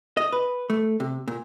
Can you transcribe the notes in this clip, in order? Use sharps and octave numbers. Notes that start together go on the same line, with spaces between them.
D#5
B4
A3
C3
A#2